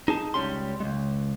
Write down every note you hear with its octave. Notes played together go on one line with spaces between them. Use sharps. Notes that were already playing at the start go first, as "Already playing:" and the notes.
D#4 G#4 A5
C#2 C3 G3 C#4 G4 C6
C#2 G#3